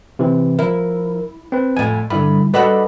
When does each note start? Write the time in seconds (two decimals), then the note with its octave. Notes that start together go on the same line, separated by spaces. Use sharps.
0.19 C3 E3 C4
0.59 F3 E4 A#4
1.52 C4 B4
1.77 F2 A2 G#5
2.10 G2 D3 E4 B5
2.54 G3 F#4 A4 B4 D#5 B5